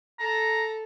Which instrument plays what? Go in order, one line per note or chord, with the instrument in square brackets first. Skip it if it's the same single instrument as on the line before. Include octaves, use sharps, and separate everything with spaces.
[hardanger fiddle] A4 [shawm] A#5